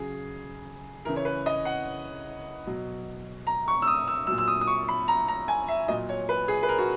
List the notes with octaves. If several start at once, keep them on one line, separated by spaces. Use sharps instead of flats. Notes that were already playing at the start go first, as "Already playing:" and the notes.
Already playing: C#3 F#3 G#4
C#3 E3 A#4
C#5
B4
D#5
F#5
B2 F#3
A#5
C#6
E6
D#6
E6
A#2 F#3 E6
E6
D#6
D#6
C#6
B5
A#5
A#5
G#5
E5
A#2 F#3 D#5
C#5
B4
G#4
B4
A#4
F#4